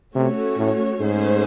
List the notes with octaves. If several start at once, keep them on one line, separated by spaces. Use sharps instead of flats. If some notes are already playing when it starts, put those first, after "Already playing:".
C3 A3 C#4 F#4 C#5
A2
G#2 A3 C#4 G#4 C5